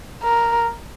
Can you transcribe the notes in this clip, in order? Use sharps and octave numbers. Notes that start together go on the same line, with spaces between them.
A#4